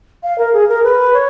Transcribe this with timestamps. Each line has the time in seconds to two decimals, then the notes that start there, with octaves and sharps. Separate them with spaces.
0.23 F5
0.38 A#4
0.53 G#4
0.68 A#4
0.84 B4
1.14 C#5